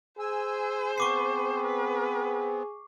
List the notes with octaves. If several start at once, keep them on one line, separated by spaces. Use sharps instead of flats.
G#4 C5 G#5 E6
B3 C4 C#6 D6 C7
B4